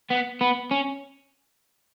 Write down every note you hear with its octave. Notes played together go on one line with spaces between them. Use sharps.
B3
B3
C#4